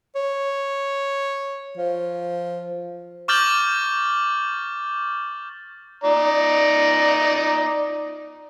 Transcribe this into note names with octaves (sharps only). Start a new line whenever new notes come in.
C#5
F3
C#6 D6 F6 G6 A6 F#7
D#4 D5 A#5